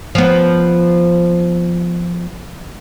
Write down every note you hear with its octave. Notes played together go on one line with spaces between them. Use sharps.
F3 B3